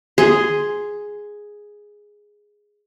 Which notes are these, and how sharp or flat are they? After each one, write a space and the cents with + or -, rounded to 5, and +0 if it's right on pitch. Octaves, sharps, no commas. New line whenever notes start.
G#4 +0 C6 +0